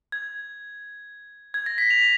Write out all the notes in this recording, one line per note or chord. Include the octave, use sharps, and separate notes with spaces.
G#6
G#6
A#6
B6
F7